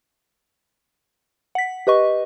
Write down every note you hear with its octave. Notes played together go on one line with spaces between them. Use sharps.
F#5 B6
G4 B4 D#5 C#6